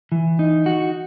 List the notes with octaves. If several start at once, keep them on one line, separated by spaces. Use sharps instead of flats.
E3
D#4
F#4